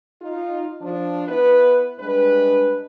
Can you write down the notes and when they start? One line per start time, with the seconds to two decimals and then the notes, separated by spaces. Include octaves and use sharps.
0.21 D#4 F4
0.81 F3 D4
1.28 B3 E4 B4
1.99 G2 G#3 D4 B4